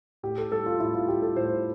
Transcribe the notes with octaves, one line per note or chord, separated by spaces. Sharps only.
A2 G4
A4
G3 A4
F4
A2 E4
F4
G3 G4
A4
A2 C5